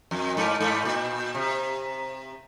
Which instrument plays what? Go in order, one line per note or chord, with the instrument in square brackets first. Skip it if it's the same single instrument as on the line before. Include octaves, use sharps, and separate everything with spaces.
[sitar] F2
G#2
G#2
A#2
C3